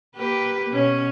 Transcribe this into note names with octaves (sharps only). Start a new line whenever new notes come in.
A#3 G4 B4
B2 C#4 C#5